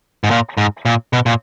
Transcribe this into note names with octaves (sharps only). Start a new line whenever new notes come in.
G#2
A#2
G#2
A#2
B2
A#2